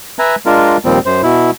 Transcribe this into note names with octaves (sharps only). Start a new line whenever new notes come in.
B4 E5 G#5 A#5
G#3 D4 F4 A#4
D#2 A#2 F3 G3 C4
F#2 C5
B2 E4